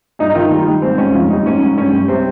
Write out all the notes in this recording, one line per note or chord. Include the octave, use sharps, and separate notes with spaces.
G2 D#4
D#4
D#3 F4
G3
G3
G#2 C4
G#2 C#4
F2 F4
G3 D#4
G#2 C#4
G#2
G2 C#4
G3
C3 C4